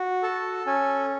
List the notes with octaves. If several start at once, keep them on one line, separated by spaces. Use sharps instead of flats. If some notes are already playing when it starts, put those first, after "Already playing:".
Already playing: F#4
A4 A5
C#4 G#5